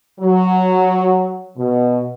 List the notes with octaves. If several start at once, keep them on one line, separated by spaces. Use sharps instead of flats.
F#3
B2